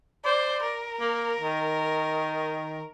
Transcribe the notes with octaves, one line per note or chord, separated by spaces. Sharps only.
C5 D5
A#4
A#3
D#3